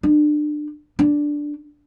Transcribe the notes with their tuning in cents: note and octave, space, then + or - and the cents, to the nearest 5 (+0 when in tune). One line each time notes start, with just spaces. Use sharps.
D4 +30
D4 +0